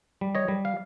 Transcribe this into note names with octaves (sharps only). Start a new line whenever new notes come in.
G3
C#5 D#5
G3
F5